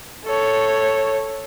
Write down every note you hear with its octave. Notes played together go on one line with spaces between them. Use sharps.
A4 C#5